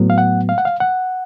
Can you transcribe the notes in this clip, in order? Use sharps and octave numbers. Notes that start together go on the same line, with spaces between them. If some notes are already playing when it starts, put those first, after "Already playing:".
Already playing: A2 F#3 B3
F5
F#5
F5
F#5
F5
F#5